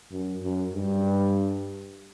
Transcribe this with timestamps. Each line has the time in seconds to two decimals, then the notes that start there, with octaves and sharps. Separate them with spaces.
0.12 F#2
0.43 F#2
0.74 G2